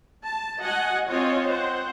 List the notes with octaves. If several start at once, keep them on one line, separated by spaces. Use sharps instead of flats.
A5
F#4 D#5 F#5 G#5
C4 F4 C#5 D#5 G#5
C4 C5 F#5